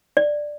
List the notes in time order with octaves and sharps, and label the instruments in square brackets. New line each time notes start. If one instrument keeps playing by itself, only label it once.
[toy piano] D5